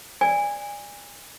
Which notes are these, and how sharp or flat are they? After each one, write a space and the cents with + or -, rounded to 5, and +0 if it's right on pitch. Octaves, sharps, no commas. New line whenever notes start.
D5 +0 G#5 -25